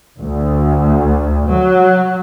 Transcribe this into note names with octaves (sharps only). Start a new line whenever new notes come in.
D2
F#3